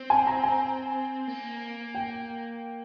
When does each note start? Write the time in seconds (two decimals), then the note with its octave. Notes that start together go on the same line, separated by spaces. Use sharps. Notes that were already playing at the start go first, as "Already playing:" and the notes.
Already playing: C4
0.10 G#5
0.27 A#5
0.44 G#5
1.27 A#3
1.95 G5